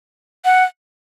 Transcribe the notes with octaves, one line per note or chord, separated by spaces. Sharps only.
F#5